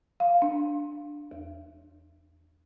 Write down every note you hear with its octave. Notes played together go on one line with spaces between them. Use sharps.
F5
D4
E2